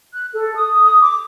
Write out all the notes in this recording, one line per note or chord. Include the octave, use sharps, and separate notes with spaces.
F#6
A4
D#6
D#6
D6